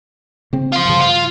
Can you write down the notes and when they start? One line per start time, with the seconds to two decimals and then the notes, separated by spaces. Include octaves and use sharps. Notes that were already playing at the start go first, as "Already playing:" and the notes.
0.53 C#3 C4
0.72 F4 C5
0.85 G2 C#3
1.00 F4